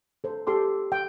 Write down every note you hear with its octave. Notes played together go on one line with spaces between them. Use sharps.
A4 C5
G4 A4 C6 D6
G5